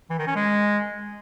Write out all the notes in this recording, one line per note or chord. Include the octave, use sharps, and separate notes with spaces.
E3
D#3
C#4
G#3